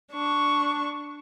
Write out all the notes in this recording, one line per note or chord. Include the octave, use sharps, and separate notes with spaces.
D4 C#6